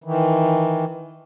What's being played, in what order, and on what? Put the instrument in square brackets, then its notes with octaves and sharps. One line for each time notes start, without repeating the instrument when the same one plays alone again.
[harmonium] D#3 E3